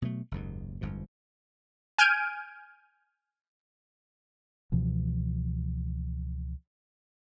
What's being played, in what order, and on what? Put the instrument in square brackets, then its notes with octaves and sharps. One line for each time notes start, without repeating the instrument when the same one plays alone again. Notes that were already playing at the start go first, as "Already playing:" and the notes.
[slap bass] B2 F#3 A3
F#1 D#2 G#2
G1 F2 G#2
[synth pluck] G#5 F6 G6 G#6 D7 D#7
[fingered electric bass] C#2 B2 E3 F3